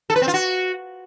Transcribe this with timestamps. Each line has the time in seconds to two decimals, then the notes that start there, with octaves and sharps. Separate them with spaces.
0.10 A4
0.16 B4
0.22 C4
0.28 F4
0.34 F#4